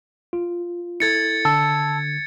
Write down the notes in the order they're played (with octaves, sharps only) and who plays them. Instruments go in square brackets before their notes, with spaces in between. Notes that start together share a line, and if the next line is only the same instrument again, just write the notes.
[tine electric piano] F4
[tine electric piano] E4 A4 [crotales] G#6 A6 C#7
[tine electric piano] D3 [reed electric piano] A5 E6